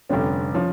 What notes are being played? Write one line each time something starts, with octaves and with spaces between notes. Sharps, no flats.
F1 F2 D3 G3 C#4
F3 C#4